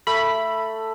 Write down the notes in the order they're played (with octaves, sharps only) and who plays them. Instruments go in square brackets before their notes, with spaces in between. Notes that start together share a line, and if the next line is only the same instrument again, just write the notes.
[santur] A3 [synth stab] B5